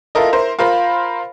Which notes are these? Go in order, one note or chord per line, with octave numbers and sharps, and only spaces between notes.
E4 F4 A4 A#4 D#5
E4 A#4 C5
F4 A#4 C5 F5 B5